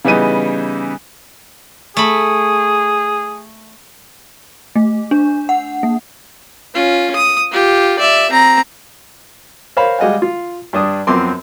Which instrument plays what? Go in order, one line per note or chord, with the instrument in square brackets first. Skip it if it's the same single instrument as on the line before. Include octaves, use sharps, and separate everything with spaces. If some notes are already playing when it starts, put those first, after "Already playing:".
[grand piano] C#3 E3 G3 B3 D#4 D#7
[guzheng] A3 B5 [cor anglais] G#4
[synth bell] A3
D4
F#5
A#3
[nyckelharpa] C#4 F4
D#6
F4 G4
D5 E5
C4 A#5
[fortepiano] A#4 C5 C#5 F5 B5
G3 G#3 D#5 F5 F#5
F4
G2 D4 D#6
F#2 F3 B3 C4 C6 D6